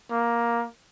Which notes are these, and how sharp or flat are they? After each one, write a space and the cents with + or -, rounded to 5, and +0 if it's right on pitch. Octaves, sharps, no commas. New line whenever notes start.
A#3 +10